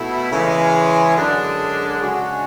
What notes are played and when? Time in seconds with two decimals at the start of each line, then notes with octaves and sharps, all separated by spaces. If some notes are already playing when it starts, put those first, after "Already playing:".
Already playing: B2 A3 E4
0.31 C#3 E3 G#3
1.16 F#2 D3 G#3 D4
2.01 C#3 G#3 D4 F#4